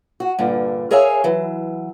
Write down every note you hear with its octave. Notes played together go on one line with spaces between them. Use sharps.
F#4
G2 A#2 D3
G#4 A#4 C#5 E5 F5 G#5
E3 F#3